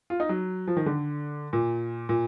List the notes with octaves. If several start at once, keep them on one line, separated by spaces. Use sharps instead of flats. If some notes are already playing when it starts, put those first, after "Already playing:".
F4
D#4
F#3
F3
D#3
D3
A#2
A#2